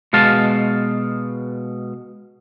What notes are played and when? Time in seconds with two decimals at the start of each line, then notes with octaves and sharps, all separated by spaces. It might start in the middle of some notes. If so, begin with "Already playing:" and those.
0.13 B2 G#3 F5 A5